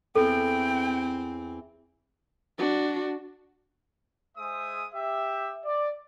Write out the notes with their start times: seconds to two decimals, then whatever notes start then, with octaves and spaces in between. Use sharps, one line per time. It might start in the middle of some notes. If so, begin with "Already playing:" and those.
0.15 E2 C4 A4 G5
2.58 D4 F#4
4.37 G#3 G#4 C5 E5 D#6
4.93 G4 E5
5.64 D5